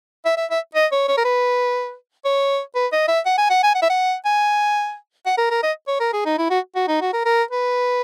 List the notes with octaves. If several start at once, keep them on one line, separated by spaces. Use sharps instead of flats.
E5
E5
E5
D#5
C#5
C#5
A#4
B4
C#5
B4
D#5
E5
F#5
G#5
F#5
G#5
F#5
E5
F#5
G#5
F#5
A#4
A#4
D#5
C#5
A#4
G#4
D#4
E4
F#4
F#4
D#4
F#4
A#4
A#4
B4